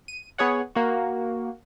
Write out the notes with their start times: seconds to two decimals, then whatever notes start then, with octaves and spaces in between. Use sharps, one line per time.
0.08 D#7
0.38 B3 G#4 C#5 F#5
0.75 A#3 F#4